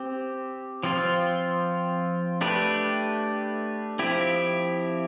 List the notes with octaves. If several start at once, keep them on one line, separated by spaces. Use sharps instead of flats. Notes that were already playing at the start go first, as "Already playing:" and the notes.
Already playing: C4 G4
F3 C4 F4
A3 D4 G4 B4
F3 C4 E4 G4